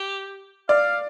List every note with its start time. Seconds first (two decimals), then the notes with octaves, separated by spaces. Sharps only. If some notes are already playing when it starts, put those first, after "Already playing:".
Already playing: G4
0.69 D5 F5